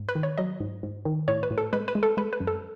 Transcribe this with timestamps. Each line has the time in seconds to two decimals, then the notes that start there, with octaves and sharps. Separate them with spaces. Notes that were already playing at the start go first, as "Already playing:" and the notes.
Already playing: G#2
0.09 B4
0.15 D#3
0.23 C#5
0.38 F#3 D#5
0.60 G#2
0.83 G#2
1.05 D#3
1.28 A2 C#5
1.43 B4
1.51 A2
1.58 A4
1.73 G#3 B4
1.88 B4
1.95 G#3
2.03 A4
2.17 G#3 B4
2.33 B4
2.40 F#2
2.47 A4